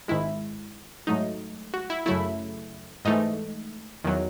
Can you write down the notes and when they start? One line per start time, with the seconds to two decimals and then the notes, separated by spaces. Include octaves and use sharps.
0.08 G#1 G#2 D#3 G#3 E4
1.07 G#2 F#3 A3 D#4
1.74 F#4
1.90 E4
2.06 F#2 C#3 F#3 A3 E4
3.05 G#2 E3 A3 D#4
4.04 E2 D#3 F#3